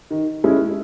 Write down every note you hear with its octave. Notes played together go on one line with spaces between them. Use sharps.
D#3
G#3 C#4 E4